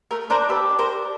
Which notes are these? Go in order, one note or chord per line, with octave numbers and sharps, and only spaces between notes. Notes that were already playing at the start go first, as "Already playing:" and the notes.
A3 A#4
D4 A#4 C5
G4 A4 B4
D4
A#4 C5
D4